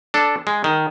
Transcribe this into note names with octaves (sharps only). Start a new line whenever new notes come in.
D4 A4
G#3
D#3